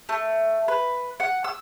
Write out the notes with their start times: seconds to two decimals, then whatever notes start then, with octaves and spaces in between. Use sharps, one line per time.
0.09 A3
0.68 B4
1.20 F#5
1.44 E6